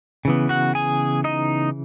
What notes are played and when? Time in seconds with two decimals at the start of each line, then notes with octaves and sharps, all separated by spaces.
0.25 C#3 E3 B3
0.49 F#4 F#5
0.75 G#4 G#5
1.24 D#4 D#5